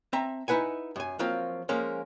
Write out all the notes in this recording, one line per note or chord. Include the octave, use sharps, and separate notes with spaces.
C4 E5 A5 A#5
D#4 E4 B4 F#5 G#5
F#2 G#5
F3 F#3 A#3 C4 F4
F3 G#3 A#3 C#4